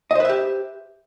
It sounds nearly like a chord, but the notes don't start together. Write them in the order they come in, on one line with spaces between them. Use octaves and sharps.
D#5 C5 B4 E5 G4